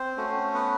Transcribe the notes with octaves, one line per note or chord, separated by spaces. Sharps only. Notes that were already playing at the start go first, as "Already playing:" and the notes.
Already playing: C4 C5
A3 C#4 F#4
B3 B4